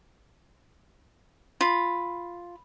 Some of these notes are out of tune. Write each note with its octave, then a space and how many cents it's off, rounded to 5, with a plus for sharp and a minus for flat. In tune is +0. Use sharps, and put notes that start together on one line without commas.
F4 +0 B5 +0